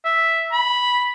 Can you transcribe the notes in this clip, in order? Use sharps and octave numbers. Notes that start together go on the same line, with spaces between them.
E5
B5